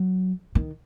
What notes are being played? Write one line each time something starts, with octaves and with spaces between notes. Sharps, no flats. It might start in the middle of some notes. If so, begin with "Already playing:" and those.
Already playing: F#3
D#3